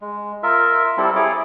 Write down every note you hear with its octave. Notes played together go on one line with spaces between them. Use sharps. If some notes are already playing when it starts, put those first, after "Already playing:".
G#3
F4 A#4 E5
G3 C4 E4 A4
E4 G#4 C#5 D6